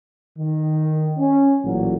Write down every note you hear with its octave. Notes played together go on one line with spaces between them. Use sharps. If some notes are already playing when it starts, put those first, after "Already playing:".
D#3
C#4
A1 A#2 F#3